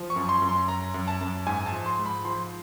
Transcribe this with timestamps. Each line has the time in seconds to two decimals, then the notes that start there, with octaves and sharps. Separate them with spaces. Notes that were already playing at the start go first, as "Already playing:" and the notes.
Already playing: F3
0.10 C#6
0.16 F#2
0.29 C6
0.42 F#2
0.49 C6
0.68 F#2 A#5
0.94 F#2
1.08 A5
1.21 F#2
1.47 G#2 G#5
1.66 A5
1.72 F3
1.86 C6
1.99 G#2
2.06 B5
2.25 F3 C6